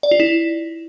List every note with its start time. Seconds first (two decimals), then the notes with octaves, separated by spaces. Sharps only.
0.03 D5
0.11 F4
0.20 E4